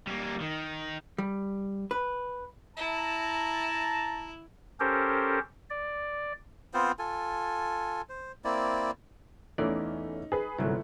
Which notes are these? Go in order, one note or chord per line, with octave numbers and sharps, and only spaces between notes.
G3 A#3
D#3
G3
B4
E4 A5 A#5
C#4 G4 A4 A#4 C5
D5
B3 C4 F4 C5
F4 A4 G#5
C5
A#3 C4 E4 D5
E2 E3 A3 C#4 D#4 D5
G#4 B4
G1 C2 G#2 F#3 A3 E4